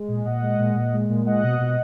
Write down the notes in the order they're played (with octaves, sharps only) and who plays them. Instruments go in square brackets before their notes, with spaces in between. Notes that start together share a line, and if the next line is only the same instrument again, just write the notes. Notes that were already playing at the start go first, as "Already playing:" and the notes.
Already playing: [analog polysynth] G#3
A#2
A#2 D#5 F#5
G#3
A#2
A#2
G#3
A#2
G#3 D#5 F#5
B2
B2